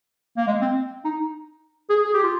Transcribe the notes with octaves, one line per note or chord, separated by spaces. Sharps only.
A#3
G#3
C4
D#4
G#4
G#4
G4
F4